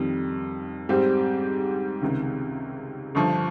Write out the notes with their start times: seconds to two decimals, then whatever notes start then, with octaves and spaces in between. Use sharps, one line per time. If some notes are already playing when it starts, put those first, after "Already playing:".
Already playing: F2 D#3 G3
0.89 G#2 G3 C4 G4
2.02 C#2 C3 D#3
3.15 G1 G2 F3